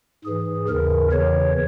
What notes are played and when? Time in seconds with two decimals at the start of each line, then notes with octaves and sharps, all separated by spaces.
0.25 G#2 E3 G#4
0.69 D#2 C#3 E3 A#4
1.12 E2 C#3 E3 C#5